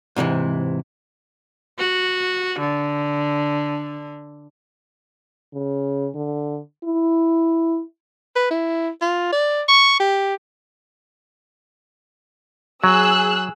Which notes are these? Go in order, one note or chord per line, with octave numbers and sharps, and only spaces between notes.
G#2 C3 D#3 E3
F#4
D3
C#3
D3
E4
B4
E4
F4
D5
C#6
G4
F#3 G#4 E6 F#6